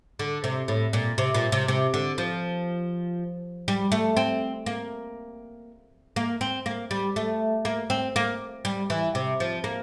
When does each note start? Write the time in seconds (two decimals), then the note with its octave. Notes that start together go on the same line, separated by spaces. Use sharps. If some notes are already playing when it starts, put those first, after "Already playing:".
0.19 D3
0.44 C3
0.68 A2
0.93 A#2
1.18 C3
1.34 A#2
1.52 C3
1.68 C3
1.94 D3
2.18 F3
3.68 G3
3.92 A3
4.17 C4
4.66 A#3
6.16 A#3
6.41 C4
6.66 A#3
6.91 G3
7.16 A3
7.65 A#3
7.90 C4
8.16 A#3
8.65 G3
8.90 E3
9.15 C3
9.40 F3
9.64 A#3